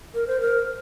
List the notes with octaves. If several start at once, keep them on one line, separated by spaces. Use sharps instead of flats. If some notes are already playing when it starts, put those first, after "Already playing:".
A#4
C5
A#4